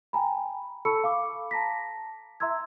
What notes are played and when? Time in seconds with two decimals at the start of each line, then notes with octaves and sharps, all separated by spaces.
0.13 G5 G#5 A#5 B5
0.85 A4 A5 B5 C#6 E6 C#7
1.04 F5 B5 D6
1.51 A5 A#5 A#6 B6
2.40 E5 A#5 C6 E6 G#6